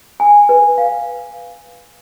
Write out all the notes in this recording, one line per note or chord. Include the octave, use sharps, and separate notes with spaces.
G#5
B4
F5